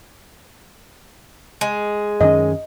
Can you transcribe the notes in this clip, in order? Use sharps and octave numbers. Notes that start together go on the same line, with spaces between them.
G#3
F#2 D#3 C#4 D#5